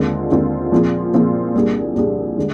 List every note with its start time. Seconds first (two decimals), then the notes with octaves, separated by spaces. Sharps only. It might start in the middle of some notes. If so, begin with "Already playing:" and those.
Already playing: D#2 D3 G#3 C4 F4
0.31 D#2 D3 G#3 C4 F4
0.72 A#2 F3 C4 F4 G#4
1.14 A#2 F3 C4 F4 G#4
1.54 C2 A#2 G3 D4 G#4
1.95 C2 A#2 G3 D4 G#4
2.37 D3 G#3